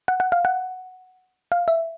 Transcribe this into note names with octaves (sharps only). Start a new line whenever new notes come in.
F#5
F#5
F5
F#5
F5
E5